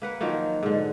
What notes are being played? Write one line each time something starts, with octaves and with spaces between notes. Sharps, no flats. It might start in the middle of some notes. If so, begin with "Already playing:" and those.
A#3 B4 F#5
D#3 F3 F#3 A#3
G#2 D3